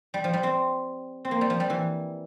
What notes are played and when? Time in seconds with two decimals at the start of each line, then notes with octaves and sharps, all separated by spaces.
0.14 G3
0.24 F3
0.33 G3
0.43 C4
1.25 C4
1.31 A#3
1.41 G3
1.50 F3
1.60 G3
1.70 E3